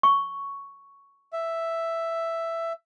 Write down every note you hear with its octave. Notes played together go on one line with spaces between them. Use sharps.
C#6
E5